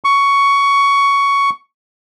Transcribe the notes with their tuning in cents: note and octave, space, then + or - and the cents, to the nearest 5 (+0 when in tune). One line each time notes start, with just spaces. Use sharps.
C#6 +10